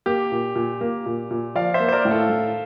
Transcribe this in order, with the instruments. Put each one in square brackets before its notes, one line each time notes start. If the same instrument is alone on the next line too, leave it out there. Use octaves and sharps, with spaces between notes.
[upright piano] A#3 [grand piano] G4
[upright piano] A#2
A#2
A#3
A#2
A#2
[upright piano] F3 [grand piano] D5 F5
[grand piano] C5 E5
[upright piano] A#3
[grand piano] C5
A#4 D5
[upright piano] A2
[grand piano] F4 A4
[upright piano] A2